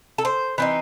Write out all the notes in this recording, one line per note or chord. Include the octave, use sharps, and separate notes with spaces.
A4
C5
E3 C4 D#4